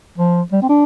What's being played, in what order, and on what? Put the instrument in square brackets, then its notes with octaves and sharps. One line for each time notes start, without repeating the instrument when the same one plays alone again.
[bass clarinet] F3
G3
C4
D4